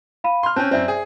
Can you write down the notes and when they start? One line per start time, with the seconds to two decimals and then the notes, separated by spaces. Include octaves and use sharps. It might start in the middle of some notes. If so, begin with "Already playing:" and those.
0.24 F5 B5 D#7
0.43 C6 F6
0.56 C4 C#4 A5 F#6 G6
0.71 F#2 C4 C5 D5 E5
0.88 G#4